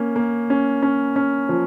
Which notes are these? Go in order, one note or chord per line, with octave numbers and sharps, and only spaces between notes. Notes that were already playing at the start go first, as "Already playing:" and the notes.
Already playing: A#3 C#4
A#3
C#4
C#4
C#4
F3